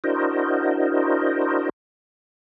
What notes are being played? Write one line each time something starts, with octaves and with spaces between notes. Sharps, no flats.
D4 E4 F#4 A#4 C5 D#5